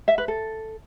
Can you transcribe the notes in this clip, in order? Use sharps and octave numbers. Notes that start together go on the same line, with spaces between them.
E5
B4
A4